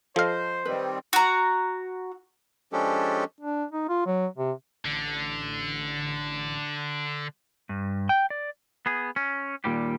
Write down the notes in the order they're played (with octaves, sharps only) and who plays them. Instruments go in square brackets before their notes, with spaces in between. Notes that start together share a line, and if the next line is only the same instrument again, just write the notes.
[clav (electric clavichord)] F3 F5 [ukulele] A4 D#5 [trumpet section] C5
[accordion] D#3 G3 C4 [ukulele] B4
[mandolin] F#4 A#5
[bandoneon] F3 G#3 C#4 D4 G4 A4
[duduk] D4
D#4
F4
F#3
C3
[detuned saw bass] A1 [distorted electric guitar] D3
[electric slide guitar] G2
G5
D5
[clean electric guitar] B3 G#4
C#4
D#2 A#2 G3 G4